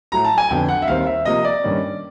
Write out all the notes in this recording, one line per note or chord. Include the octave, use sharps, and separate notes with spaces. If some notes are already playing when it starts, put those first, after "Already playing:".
A2 F#3 A3 A#5
A5
G#5
F2 D3 F#3 B3 G5
F#5
E5
D#2 D#3 G3 C4 F5
E5
C3 F3 A#3 D#5
D5
G2 D#3 G3 A#3 C#4